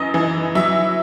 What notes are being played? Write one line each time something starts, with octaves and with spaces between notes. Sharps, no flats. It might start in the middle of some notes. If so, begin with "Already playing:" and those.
Already playing: F#2 E3 D#5
E3
F#3 E5